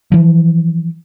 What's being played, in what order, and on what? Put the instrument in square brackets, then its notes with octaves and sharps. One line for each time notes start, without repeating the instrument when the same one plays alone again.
[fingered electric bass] E3 F3